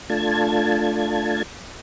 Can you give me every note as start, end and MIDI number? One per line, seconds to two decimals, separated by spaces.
0.10 1.43 57
0.10 1.43 62
0.10 1.43 65
0.10 1.43 81
0.10 1.43 92